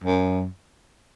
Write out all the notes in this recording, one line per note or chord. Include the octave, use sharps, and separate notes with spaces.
F#2